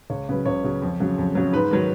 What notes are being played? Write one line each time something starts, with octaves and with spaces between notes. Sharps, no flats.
C#2 C#5
C#3 F#3 B4
C#2 C#5
C#3 F#3
F2
C#3 F#3
F2
C#3 F#3
G#2 B4
D#3 F#3